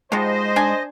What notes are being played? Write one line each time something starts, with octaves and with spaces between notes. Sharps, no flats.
G#2 F3 G3 G#3 C5 D#5
D4 G#5